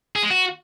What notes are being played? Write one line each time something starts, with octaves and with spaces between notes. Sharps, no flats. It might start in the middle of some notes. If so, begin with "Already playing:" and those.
G#4
G#3
F#4